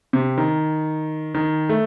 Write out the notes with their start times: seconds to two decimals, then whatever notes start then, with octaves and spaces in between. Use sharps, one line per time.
0.13 C3
0.38 D#3
1.35 D#3
1.69 A3